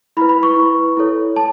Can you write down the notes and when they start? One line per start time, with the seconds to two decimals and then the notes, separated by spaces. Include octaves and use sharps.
0.17 E4 B5
0.21 B4
0.29 B5
0.43 C#6
0.56 E4 B4
0.97 E4 A4 C#5
1.36 A5